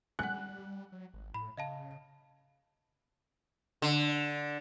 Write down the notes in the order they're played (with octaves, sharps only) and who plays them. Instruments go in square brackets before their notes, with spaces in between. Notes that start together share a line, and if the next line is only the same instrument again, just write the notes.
[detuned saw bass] G3 [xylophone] F#5 G#5 [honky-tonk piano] F#6
[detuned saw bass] F#3
G#1
[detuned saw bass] A2 [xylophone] B5
[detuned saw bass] C#3 [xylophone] D#5 F5 A5
[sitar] D3